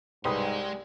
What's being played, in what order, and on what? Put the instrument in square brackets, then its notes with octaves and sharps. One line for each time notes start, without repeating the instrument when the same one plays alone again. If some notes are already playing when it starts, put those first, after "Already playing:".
[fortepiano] C2 B4 D#6 [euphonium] G#2 [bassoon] G3 [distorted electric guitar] G#3 C6